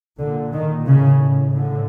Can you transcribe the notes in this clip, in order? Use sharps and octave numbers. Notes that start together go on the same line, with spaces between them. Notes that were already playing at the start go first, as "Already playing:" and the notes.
A#2 D3
D#3
A2 C#3
A2 D3